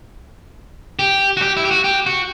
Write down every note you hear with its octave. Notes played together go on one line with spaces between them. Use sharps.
G4
F#4
G4
E4
G4
F#4
G4
F#4